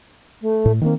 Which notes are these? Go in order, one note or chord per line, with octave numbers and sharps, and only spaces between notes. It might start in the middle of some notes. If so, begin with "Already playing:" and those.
A3
A2
D#3 A#3 C4